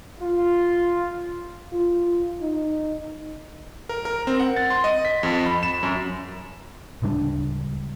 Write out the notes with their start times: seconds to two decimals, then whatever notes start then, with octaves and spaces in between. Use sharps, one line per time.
0.20 F4
1.73 F4
2.41 D#4
3.89 A#4
4.05 A#4
4.27 C4
4.40 F#5
4.56 A6
4.70 C6
4.84 D#5
5.05 B6
5.23 F2
5.46 B5
5.63 E7
5.83 F#2
7.02 D1 C#2 G3 D4